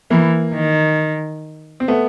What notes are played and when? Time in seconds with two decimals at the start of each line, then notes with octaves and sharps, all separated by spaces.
0.11 E3 A#3
0.54 D#3
1.80 C4
1.88 A3 B3